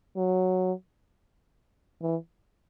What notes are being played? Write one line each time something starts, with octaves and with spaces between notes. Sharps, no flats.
F#3
E3